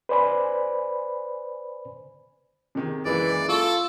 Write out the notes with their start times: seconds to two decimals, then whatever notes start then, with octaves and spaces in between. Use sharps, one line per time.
0.09 B4 C5 D5 G#5 B5
2.75 C3 D#3 G#4
3.05 F#1 E3 G#3 A#3 D5
3.49 F4 A4 C#6